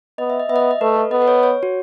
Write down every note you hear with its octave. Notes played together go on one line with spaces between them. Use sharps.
B3 D#5
E5
D#5
B3 E5
D#5
E5
D#5
A3 B4
A4
B3 D#5
B4
C#5
C#5
F#4